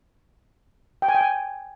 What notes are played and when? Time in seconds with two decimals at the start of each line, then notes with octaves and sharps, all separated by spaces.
1.02 G5
1.08 G#5
1.15 G5
1.21 G#5